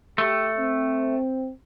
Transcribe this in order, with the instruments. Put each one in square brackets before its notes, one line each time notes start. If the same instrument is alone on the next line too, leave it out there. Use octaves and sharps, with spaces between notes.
[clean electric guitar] A3 [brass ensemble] G4
[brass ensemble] C4